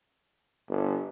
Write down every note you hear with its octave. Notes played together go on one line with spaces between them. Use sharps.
G1